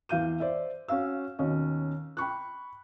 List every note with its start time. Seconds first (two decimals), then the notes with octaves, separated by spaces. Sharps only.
0.09 E2 F5 G6 D#7
0.40 C5 D5 E5
0.88 C#4 F#4 F5 E6
1.39 D#2 B2 C#4 C#5 D#5
2.17 G5 B5 C#6 F#6